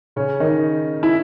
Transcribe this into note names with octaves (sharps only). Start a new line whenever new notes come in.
C#3 C#4
D#3 D#4
E4